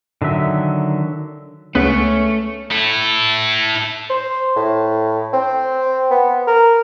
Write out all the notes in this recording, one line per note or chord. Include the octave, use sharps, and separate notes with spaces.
D3 D#3 F#3 E5
C#2 A3 B3 C#4 B4
E4 A4
C5
A2
C4
B3
A#4